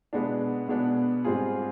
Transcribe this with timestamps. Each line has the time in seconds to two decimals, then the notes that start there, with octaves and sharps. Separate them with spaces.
0.13 B2 G#3 B3 D4
0.68 B2 G#3 B3 D4
1.25 G#2 G3 C4 F4 G#4